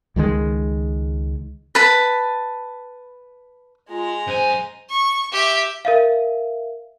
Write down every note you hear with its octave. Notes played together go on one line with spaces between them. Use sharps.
C#2 D#3 F#3 G#3
B4 A5 B5
G#3 F4 A#5
F#2 C5 G#5
C#6
G4 E5
A#4 E5 F5